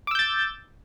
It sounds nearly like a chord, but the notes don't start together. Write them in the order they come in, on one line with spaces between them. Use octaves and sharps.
D6 E6 G6 A6